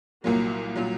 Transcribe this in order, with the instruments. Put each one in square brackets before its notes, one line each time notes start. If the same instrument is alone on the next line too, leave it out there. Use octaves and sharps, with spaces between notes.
[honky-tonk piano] C2 A#2 F#3 [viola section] A#3
[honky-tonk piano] A#2 F#3